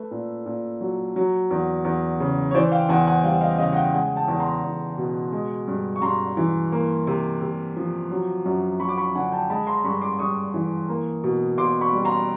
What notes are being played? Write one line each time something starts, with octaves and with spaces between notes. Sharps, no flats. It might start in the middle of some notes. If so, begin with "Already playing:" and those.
Already playing: A3 A4 B4
A#2
A#2
F#3
F#3
E2
E2
C#3
C#5
E3 C5 D5
F5 G5
E2 F#5 G#5
F#5 G#5
G3 F5 G5
D#5 F5
C#3 D#5 F5
F#5
F5 G5
G#3 F#5 G#5
G5 A5
E2
A#5 C6
E2
B2
G#3
G2
C#6
G2 A#5 C6
E3
A#3
C3
C3
F3
F#3
F#2
F#2 B5 C#6
D6
B5 C#6
D3 F#5 G#5
G5 A5
G#3 A5 B5
A#5 C6
G2 B5 C#6
C6 D6
G2 C#6 D#6
E3
A#3
B2
B2 C6 D6
B5 C#6
G3
A#5 C6